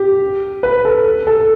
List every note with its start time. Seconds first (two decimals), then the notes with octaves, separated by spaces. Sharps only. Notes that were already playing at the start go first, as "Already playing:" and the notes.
Already playing: G4
0.63 B4
0.85 A4
1.27 A4